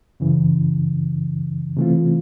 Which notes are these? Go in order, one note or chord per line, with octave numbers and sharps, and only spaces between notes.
F#2 C#3 E3
C3 E3 A3 C4 F4